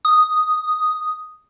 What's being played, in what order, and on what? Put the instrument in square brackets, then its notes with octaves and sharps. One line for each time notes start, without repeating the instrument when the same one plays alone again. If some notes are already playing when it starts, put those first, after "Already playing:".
[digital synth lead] D#6